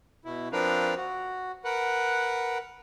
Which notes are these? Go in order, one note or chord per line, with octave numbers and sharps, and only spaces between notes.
B2 E4
F3 C4 D4 A#4 B4 F5
F#4
A#4 B4 F#5